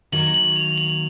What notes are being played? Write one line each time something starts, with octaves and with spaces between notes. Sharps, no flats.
D#3 F#3 A#3 F#7
F#7
F7
F#7